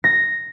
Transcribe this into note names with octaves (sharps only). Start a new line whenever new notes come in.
A#6